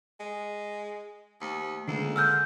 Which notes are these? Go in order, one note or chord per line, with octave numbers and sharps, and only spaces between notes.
G#3
D#2 A3 C5
C#2 D3 G#3 A#3 A4
G#2 E6 F6 G6